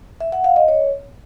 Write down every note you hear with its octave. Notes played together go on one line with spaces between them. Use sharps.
E5
F#5
F5
D#5
C#5